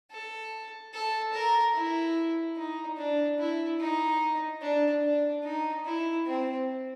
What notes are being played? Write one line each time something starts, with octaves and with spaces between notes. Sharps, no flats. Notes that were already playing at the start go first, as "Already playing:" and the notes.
A4
A4
A#4
E4
D#4
D4
E4
D#4
D4
D4
D#4
E4
C4